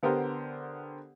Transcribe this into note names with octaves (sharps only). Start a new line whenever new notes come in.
D3 B3 G4 A#4 C5